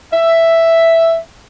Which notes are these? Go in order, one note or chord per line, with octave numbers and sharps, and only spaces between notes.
E5